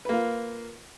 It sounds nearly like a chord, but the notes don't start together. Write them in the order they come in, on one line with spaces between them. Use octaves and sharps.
B4 A#3 F4